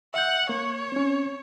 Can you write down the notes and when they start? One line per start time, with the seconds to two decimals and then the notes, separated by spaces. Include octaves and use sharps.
0.14 E5 F#5 G6
0.49 A#3 C#5
0.92 C4 C#4